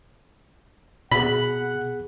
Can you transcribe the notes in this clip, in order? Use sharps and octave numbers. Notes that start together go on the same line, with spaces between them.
B2 B3 G#4 F#5 B5